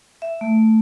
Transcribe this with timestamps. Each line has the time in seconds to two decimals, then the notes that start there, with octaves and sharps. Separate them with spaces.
0.22 E5
0.41 A3